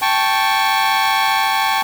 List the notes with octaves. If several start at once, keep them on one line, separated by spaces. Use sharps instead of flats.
G5 A5 C#6